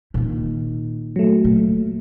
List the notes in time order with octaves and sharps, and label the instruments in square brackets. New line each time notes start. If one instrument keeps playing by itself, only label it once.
[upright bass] A#2 D#3
[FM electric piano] F#3 A3
[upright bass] A#2